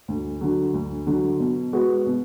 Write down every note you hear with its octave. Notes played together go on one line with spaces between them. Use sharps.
D2
D3 F#3
D2
D3 F#3
B2
G#3 B3 F#4
B2